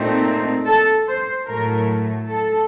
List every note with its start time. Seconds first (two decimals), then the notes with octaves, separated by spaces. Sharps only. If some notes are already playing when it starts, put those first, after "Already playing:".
Already playing: A#2 A3 C4 D#4
0.66 A4
1.07 C5
1.47 A2 F#3 A3 A#4
2.28 A4